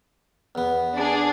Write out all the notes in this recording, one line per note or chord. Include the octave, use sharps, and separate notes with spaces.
E2 B3
D4 G#4